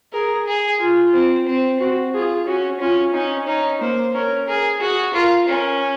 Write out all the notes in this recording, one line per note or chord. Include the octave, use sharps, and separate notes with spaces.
G#4 A#4
G#4
F4
C4
C4
C4 F#4
F4 G#4
C#4 F#4
C#4 F4
C#4 D#4
C#4 D#4
A#3 C5
C#4 A#4
G#4 A#4
F#4 G#4
F4 A#4
C#4 A#4